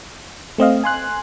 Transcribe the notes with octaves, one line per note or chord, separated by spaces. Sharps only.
A3 C4 D#5 F5
G#5 C6 F#6